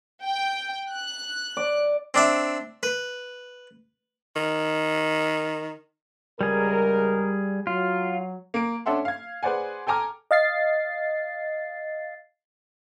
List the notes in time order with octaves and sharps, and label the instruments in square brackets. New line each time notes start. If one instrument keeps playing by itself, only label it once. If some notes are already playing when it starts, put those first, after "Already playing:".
[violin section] G5
F#6
[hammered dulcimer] D5
[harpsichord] C4 D4 E5
B4
[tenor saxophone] D#3
[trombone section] C#2 A#4 [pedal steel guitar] G3 G#4
[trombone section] F#3 [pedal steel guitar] F4
[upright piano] A#3 D7
C#4 D4 A4 E5 F#5 C6
F5 G#6
G#4 B4 C5 D5 F#5 G#5
A4 G5 G#5 A#5 D6 F6
[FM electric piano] D#5 F5 A6 C7